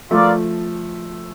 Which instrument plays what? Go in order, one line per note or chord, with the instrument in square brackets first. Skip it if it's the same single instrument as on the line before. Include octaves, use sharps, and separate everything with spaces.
[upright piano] F3 A3 [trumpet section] F4 A#4 D5 F5